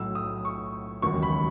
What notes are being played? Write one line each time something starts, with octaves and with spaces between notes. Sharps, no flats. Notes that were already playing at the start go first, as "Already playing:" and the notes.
Already playing: B1 A2 F#3 E6
D#6
C#6
E1 D#2 C#3 F#3 C#6
B5